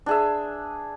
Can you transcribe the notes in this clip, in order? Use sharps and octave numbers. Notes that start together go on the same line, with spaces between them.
D4 G#4 E5